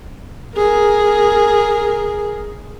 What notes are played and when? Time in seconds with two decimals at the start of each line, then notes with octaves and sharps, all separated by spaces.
0.57 G#4 A#4